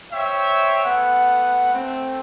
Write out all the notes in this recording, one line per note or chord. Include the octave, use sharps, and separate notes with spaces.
C5 C#5 E5 G5
A3 B3 F#5
A3 C4